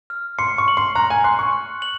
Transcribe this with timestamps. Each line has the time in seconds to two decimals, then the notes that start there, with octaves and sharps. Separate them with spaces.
0.10 F6
0.39 C6 C#7
0.58 C#6
0.68 F#7
0.77 C6
0.95 A#5 F#6
1.10 G#5
1.24 C6 F#6
1.39 C#6
1.53 F#6
1.82 F#7